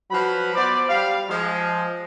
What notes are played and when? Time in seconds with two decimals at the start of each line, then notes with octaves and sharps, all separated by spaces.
0.11 F3 F#3 B4 B5
0.56 B3 C5 D5
0.89 G3 F5
1.29 F3 G#3